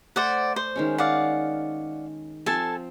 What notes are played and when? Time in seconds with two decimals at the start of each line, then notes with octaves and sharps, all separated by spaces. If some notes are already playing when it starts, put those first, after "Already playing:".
0.16 A3 C5 D5 F#5
0.56 C5
0.76 D#3 G#3 C#4
0.98 D5 F5 F#5
2.46 F3 C4 A4 G#5 A5